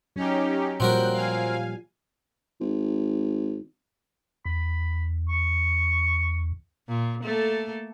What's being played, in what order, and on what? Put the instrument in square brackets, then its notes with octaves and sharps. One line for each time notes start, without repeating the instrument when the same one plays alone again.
[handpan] F#3 [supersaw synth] C#4 D#4 G4
[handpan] A#2 F3 G3 [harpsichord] C4 F#4 A#4 [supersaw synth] F#6 G6
[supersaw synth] F5 G#5
[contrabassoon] G#1
[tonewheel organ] E2 [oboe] B5
[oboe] C#6
[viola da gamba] A#2
A3 A#3 A4